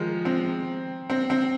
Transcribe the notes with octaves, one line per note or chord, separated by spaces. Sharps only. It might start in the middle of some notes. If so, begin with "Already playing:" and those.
Already playing: D#3 F3 G#3
C4
C4
C4